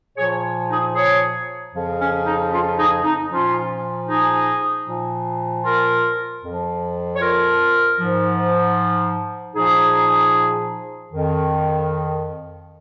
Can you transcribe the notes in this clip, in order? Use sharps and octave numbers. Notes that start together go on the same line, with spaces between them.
A#2 F3 G#4 C#5
D#4 G#4
G#4 C#5
F2 C#3 F3
C#4
D#4
C#4 F4
D#4 G#4
D#4
A#2 F3 C#4 F4
D#4 G#4
A#2 F3
F4 A#4
F2 F3
C#5
F4 A#4
G#2 F3
A#2 F3 D#4 G#4
F2 D#3